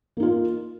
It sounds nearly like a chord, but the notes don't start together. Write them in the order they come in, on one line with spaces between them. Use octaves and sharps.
A#3 D#4 F4